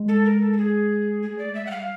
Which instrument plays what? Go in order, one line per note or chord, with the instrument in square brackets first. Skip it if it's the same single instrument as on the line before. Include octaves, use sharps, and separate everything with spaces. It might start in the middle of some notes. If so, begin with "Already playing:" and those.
Already playing: [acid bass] G#3
[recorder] A4
A#4
A4
A4
G#4
[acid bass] A3 [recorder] G#4
[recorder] D5
[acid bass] G#3
[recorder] E5
[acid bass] G3 [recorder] F#5
[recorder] F5